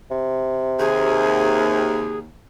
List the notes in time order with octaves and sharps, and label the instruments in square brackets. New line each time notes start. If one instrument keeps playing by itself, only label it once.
[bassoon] C3
[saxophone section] D#2 [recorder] G#4